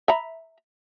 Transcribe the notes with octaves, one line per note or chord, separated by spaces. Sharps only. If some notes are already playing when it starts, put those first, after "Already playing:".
E5 A#5 B5